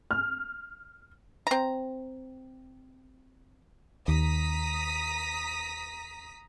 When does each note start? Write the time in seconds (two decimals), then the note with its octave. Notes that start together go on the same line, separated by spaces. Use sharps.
0.11 F6
1.47 C4 A#5
4.08 D#2 A#5 D#6 B6